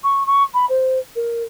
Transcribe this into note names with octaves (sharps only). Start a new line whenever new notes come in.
C#6
C#6
B5
C5
A#4